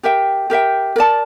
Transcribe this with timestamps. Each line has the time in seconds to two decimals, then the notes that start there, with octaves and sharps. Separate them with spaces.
0.03 G4 A#4 E5 G5
0.50 G4 A#4 E5 G5
0.96 A#4 D5 A5